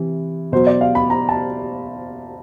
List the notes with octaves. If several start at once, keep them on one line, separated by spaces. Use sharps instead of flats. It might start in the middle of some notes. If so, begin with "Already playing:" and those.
Already playing: C3 E3
B2 F#3 C5
D5
F5
B5
A#5
A5